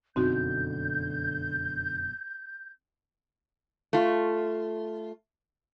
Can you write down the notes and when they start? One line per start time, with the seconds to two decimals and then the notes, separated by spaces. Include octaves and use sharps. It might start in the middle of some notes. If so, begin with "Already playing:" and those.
0.16 F1 F#2 B2 D3 C4 D#4 F#4 G6
3.93 A3 F4